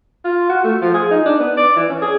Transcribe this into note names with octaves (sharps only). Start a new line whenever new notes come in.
F4
F#4
A3
F3
G#4
D#4
D4
B3
D5
E3
C#4
G#4